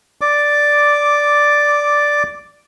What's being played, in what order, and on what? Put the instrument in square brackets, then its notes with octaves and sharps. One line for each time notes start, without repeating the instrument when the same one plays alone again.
[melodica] D5 D6